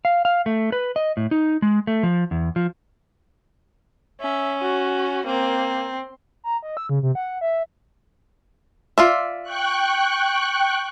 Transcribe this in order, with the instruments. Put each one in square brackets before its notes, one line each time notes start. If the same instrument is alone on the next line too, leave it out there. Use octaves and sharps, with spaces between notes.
[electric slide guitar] F5
F5
A3
B4
D#5
A2
D#4
G#3
A3
F3
E2
F3
[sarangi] C#4 [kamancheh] E5
[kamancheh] F#4
[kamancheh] A#3 [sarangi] C4
[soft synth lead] A#5
D#5
E6
C#3
C3
F#5
E5
[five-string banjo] F4 D5 E5
[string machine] G5 C#6 F#6